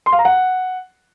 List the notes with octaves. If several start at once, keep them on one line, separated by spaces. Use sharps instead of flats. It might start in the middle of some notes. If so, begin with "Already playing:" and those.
C6
F5
A#5
F#5